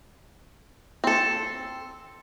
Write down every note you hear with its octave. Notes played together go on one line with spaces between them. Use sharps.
C4 A4